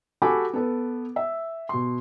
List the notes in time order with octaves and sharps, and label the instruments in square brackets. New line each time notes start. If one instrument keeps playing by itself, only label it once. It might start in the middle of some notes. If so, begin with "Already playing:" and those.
[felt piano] F#4 G4 A4 G#5 B5 D6
B3 A4 B4
E5
B2 C6